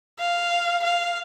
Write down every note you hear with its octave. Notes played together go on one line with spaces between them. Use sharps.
F5
F5